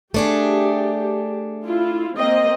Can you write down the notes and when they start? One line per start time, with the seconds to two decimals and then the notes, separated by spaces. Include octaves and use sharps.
0.14 A3 D4 G4 G#4
1.64 E4 F4
2.16 A#3 C4 D#5